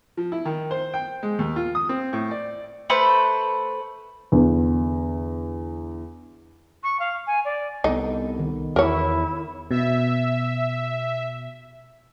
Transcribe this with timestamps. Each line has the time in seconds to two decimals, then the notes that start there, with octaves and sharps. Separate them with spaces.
0.17 F3
0.32 E4
0.45 D#3
0.71 C5
0.94 G5
1.23 G#3
1.39 D#2
1.56 F4
1.75 D#6
1.89 C4
2.13 A2
2.31 D5
2.90 A3 B4 C5
4.32 E2 D3
6.83 C#6
6.99 F5
7.26 G#5
7.44 D5
7.84 C2 B3 D#4 A4
8.39 D#3
8.76 E2 E4 A#4 C#5 E5
9.71 B2 E5